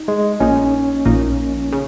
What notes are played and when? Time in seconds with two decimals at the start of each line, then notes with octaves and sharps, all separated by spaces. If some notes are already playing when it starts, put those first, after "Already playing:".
Already playing: D#4
0.08 G#3
0.40 A#1 A#2 A#3 C#4 D#4
1.05 A#1 A#2 A#3 D#4
1.72 C#3